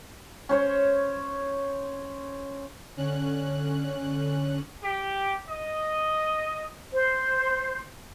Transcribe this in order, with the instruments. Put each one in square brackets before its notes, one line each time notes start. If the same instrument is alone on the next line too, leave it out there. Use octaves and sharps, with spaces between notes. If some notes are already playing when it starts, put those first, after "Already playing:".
[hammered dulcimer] C#4 C5 C#5
[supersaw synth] D3 C#4 F#6
[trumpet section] G4
D#5
[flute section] C5